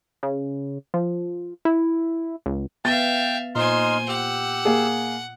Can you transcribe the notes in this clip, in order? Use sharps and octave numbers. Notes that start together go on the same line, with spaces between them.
C#3
F3
E4
C#2
B3 E5 F5 G5 A6
A#2 D#4 C5 G#5 C6 F6
G4 F#5 E6
A#3 G#4